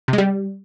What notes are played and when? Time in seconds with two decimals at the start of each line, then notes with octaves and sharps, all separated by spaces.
0.08 C3
0.13 G#3
0.18 G3